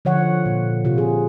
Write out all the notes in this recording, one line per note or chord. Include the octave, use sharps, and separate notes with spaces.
D3 F3 C#5 F#5
A#2
C3 F4
G#4